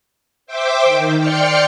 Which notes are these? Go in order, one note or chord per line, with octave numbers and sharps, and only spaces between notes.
C5 E5 G5 D6
D#3
D5 G5 C6 F6 C#7